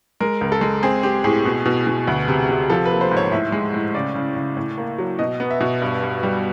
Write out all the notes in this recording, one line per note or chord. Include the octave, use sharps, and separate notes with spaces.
G#3 A#4
C#2
A4
G#3
C4 G#4
C4 G4
A2 G#4
B2
B2
B2
D2
C3
C3
F3 A4
B4
A#3
C5
G#2
C#5
A2 E5
G#3
A2
C#3 D5
C#3
C#3
A2
A#3
F#3
B2 D#5
B3
E5
B2
G2
G2
G3